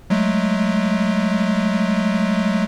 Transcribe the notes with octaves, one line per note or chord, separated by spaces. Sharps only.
F#3 G#3 A3